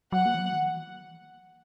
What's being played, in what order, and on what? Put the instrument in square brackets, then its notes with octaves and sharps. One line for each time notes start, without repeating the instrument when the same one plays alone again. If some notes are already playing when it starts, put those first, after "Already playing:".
[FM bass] F#3 [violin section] F#5
[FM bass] A#3
E3
F#3
D#3
E3